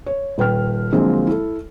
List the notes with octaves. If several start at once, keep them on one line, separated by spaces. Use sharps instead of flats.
C#5
D#1 B4 G5 F6
D3 F3 F#3 G#3 A#3 C4
E4 A4